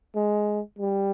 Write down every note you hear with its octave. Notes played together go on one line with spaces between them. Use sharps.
G#3
G3